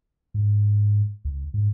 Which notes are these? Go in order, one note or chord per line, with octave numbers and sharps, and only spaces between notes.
G#2
C#2
G#2